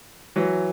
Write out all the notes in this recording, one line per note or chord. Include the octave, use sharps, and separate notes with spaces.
E3 F#3